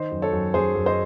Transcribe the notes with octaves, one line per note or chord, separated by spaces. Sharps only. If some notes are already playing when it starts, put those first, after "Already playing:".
Already playing: D#3 C5 D#5
F#2
A4 C#5
F#2
F#2 G#4 C5
F#2
C5 D#5